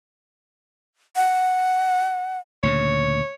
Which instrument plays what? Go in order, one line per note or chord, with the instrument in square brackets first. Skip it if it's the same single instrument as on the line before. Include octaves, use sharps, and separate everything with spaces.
[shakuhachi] F#5
[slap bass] D2 A#2 C#3 [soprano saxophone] C#5